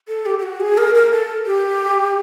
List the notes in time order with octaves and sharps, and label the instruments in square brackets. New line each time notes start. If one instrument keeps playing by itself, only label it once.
[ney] A4
G4
G4
F#4
G#4
A#4
A#4
A4
G4